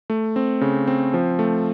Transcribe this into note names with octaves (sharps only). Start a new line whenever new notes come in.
A3
C4
C#3
C4
F3
A3